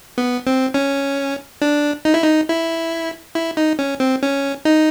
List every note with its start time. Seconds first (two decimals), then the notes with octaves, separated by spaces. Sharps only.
0.18 B3
0.47 C4
0.74 C#4
1.62 D4
2.05 D#4
2.14 E4
2.23 D#4
2.49 E4
3.35 E4
3.57 D#4
3.79 C#4
4.00 C4
4.23 C#4
4.65 D#4